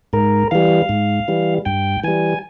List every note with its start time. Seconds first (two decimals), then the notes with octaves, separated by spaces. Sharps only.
0.13 G#2 A#4
0.51 E3 G3 F5
0.89 G#2
1.28 E3 G3
1.65 G2 G5
2.04 E3 G3 G#5